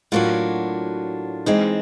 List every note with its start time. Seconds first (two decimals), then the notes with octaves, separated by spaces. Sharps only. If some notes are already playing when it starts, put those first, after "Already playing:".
0.12 A2 F#3 A#3 D4 F4 F#4
1.46 E3 G#3 C4 D#4